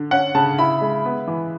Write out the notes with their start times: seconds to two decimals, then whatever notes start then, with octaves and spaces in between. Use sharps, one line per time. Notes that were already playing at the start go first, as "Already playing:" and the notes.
Already playing: D3
0.11 C#4 F#5
0.35 C#3 A5
0.58 E4 B5
0.81 G#3
1.05 B3
1.27 E3